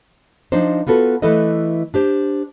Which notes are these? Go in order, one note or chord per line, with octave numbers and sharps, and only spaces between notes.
F3 D4 D#4 C5
B3 F4 F#4 A4 B4
E3 A3 E4 A4 B4 D#5
D4 G4 C5